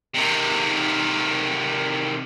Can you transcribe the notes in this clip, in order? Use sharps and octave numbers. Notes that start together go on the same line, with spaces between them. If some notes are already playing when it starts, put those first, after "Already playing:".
C3 D#3